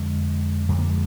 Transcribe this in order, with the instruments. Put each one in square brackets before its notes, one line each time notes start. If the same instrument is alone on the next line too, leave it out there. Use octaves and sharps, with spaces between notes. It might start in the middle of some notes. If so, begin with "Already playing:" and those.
Already playing: [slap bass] F2 D3 G#3
F2 D3 G#3
A#3
G#3